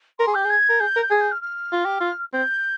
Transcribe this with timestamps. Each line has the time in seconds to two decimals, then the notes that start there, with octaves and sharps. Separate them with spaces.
0.19 A#4 C6
0.27 G#4
0.34 G4 G6
0.45 G#4 G#6
0.69 A#4
0.80 G#4 G6
0.96 A#4
1.02 G6
1.10 G#4 G#6
1.20 G6
1.31 F6
1.42 F6
1.72 F4
1.85 G4
2.00 F4
2.33 C4 G6